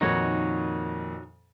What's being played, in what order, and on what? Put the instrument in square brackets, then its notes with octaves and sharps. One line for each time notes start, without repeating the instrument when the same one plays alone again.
[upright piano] F2 A#2 D#3 [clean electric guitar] D#4 F#4 C#5